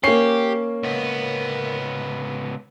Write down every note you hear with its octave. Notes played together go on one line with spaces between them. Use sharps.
A#3 C#4 G4 C7
C#2 B3